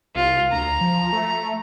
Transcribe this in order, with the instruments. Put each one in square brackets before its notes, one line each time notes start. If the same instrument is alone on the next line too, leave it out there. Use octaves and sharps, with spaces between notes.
[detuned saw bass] C2 [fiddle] F4
[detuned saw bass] D2 [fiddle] A#5
[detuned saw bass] F3
A3